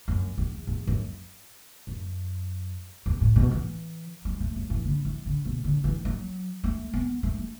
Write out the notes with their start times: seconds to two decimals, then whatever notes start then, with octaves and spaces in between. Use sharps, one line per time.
0.08 F#2
0.38 E2
0.67 E2
0.87 F#2
1.87 F#2
3.06 E2
3.21 A2
3.36 B2
3.51 E3
4.25 F#3
4.40 A3
4.56 F#3
4.70 E3
4.85 D3
5.05 E3
5.26 D3
5.45 B2
5.64 D3
5.84 E3
6.05 F#3
6.64 A3
6.94 B3
7.23 A3
7.39 A3